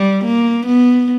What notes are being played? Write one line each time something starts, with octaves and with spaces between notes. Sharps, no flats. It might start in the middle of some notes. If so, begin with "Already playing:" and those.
Already playing: G3
A#3
B3